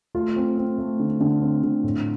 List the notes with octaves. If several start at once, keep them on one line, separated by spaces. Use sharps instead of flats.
A3 F4
C4
C4
A3
D3
D3
C4
D3
A2